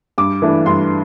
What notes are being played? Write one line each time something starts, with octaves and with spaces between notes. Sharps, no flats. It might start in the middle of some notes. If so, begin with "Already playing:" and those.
G2 D6
E3 A3 D4
G2 C6